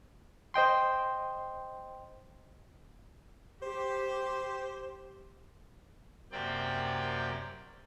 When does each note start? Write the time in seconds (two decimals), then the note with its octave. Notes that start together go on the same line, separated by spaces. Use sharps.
0.54 C5 D#5 G5 C6
3.62 G4 C5
6.32 F#2 C3 A#3 C4 D5 G5